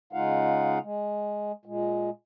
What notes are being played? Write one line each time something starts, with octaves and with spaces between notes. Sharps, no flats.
C#3 G#3 D#4 F4 F5 F#5
G#3
A#2 G#3